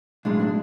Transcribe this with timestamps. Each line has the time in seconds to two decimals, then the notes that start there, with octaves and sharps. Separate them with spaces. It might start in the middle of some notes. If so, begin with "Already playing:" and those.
0.25 B1 A2 G#3 D4
0.40 D4